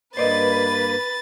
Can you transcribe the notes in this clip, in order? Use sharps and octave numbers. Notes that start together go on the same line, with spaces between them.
G2 A#3 B4 C5 D5 D#5 A6